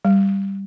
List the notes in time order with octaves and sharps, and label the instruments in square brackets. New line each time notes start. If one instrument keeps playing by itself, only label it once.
[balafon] G3